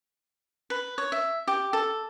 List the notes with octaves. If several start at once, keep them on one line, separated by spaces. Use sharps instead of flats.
B4
C#5
E5
G4
A4